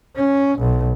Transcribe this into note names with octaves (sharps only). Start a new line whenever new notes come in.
C#4
B1